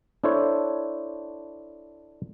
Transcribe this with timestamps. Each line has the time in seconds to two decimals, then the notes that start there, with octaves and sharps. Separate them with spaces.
0.24 D4 E4 A4 C5 C#5